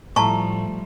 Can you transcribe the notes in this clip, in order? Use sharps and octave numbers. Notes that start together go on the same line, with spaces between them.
A2 F3 G3 A3 A5 A#5 C#6